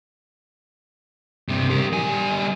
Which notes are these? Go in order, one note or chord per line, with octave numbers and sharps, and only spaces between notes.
G2 C3
G4 A#4
G3 G#5